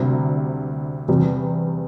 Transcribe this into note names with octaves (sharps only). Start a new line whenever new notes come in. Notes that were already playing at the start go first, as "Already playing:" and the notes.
Already playing: D2 C3 G3
E2 C3 G3